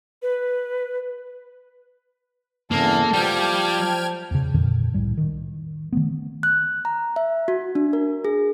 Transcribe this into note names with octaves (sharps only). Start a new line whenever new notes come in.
B4
E2 G2 C#3 A#3 A4
F3 G3 G5 F6 G#6
A5
E2 C#3
F2 A#2 D3 D#3
C2 A2 G3
D#3
D#3 A3 B3
F#6
A#5
E5
F#4
D4
A#4
G#4